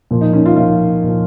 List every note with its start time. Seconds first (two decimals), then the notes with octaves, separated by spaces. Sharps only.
0.11 A#2 F3
0.21 D#4
0.33 C#4
0.46 F4
0.56 A#2 F3 F4
1.04 A#2 F3